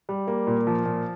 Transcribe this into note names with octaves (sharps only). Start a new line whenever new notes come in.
G3
A#3
A#2
F3
A#2